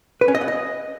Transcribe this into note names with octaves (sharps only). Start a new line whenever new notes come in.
B4
C#4
D#5
F#5
D#5